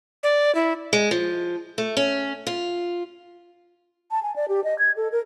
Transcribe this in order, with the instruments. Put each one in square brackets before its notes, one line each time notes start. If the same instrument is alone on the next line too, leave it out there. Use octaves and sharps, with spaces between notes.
[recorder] D5
E4
[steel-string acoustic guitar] G#3
F3
A3
C#4
F4
[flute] A5
G#5
D5
G4
D#5
G#6
A4
A#4